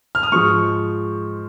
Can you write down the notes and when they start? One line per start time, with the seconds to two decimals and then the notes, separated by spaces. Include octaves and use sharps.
0.15 F6
0.23 D#6
0.32 G#2 F3 G#3 C#6